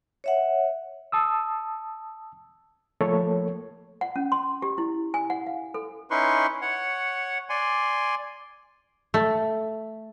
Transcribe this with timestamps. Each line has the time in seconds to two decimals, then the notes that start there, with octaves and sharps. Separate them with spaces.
0.24 C#5 E5 F#5
1.12 A5 D#6 E6
3.01 F3 A3 A#3 A4 C#5
4.01 F#5
4.16 C#4
4.32 C6
4.62 G4
4.78 E4
5.14 G#5
5.30 F#5
5.47 F5
5.74 A4
6.11 C#4 D#4 E4 B4 C6 C#6
6.62 C#5 F#5
7.50 D5 G#5 C6
9.14 A3